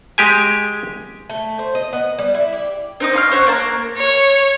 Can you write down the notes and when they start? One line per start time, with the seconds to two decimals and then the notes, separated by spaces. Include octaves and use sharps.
0.18 G#3 G4 G#5
1.30 A3
1.59 C5
1.75 D#5
1.93 B3
2.19 G3
2.34 E4
2.53 G4
3.00 C4 D#4 D#6
3.13 C#4 F4 C6 F6
3.31 C5 C#5 E5 F#5
3.47 A#3 A5 A#5
3.98 C#5